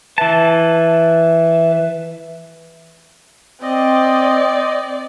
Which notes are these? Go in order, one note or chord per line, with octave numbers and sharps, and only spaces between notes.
E3 B4 E5 A5
C4 D5 D#5